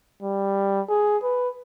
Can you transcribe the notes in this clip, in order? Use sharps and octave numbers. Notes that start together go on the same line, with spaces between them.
G3
G#4
B4